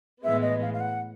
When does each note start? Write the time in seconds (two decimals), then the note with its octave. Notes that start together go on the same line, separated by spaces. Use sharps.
0.24 A2 E3 G#3 B3 E5
0.42 D#5
0.62 F5
0.74 F5
0.80 F#5